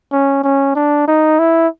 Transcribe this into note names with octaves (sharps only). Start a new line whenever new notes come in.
C#4
C#4
D4
D#4
E4